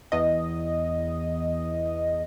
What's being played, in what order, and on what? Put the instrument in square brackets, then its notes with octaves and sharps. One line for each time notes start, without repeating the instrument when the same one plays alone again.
[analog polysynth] E2 D#5